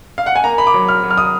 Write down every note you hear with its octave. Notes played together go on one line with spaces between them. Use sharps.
F5
F#5
G#5
A#3 A#5
B5
D6
F#3
F6
F#3
F6
D#6